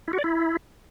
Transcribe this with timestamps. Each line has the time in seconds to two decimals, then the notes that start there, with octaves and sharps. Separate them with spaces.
0.08 E4
0.13 F#4
0.19 D5
0.24 E4